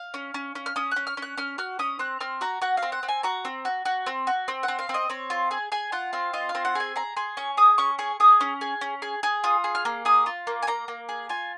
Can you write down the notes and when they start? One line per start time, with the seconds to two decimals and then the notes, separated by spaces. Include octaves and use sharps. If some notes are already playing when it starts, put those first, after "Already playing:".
Already playing: F5
0.14 C#4
0.34 C#4
0.55 C#4
0.66 F6
0.76 C#4 D#6
0.91 C#4 F#6
1.07 F6
1.17 C#4
1.22 F#6
1.37 C#4 F6
1.58 F#4 F6
1.79 C#4 D#6
1.99 C4 F#6
2.21 C4 F6
2.41 F#4 A#5
2.62 F#4 F#5
2.77 F5
2.82 C4
2.92 F#5
3.03 C4
3.08 G#5
3.23 F#4 A#5
3.45 C4
3.65 F#4
3.85 F#4
4.06 C4
4.27 F#4
4.48 C4
4.63 F#5
4.68 C4
4.79 F5
4.89 C4
4.94 D#5
5.09 C4 C#5
5.30 F4
5.51 G#4
5.72 G#4 G#5
5.92 F4 F#5
6.13 C4 F5
6.33 F4 D#5
6.49 F5
6.55 C4
6.65 F#5
6.75 G#4 G#5
6.96 G#4 A#5
7.17 G#4 C6
7.37 C#4 C#6
7.57 G#4 D#6
7.78 C#4 C#6
7.99 G#4 C#6
8.20 G#4 D#6
8.41 C#4
8.61 G#4
8.81 C#4
9.02 G#4
9.23 G#4
9.44 F4 D#6
9.64 G#4
9.75 F6
9.85 A#3
10.05 G#4 D#6
10.26 F4
10.47 A#3
10.63 G#5
10.67 A#3 A#5
10.88 A#3
11.09 G#4
11.29 F4 G#5